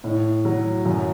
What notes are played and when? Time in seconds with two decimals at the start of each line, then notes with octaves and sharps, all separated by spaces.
0.04 A2
0.45 F#3
0.86 F#2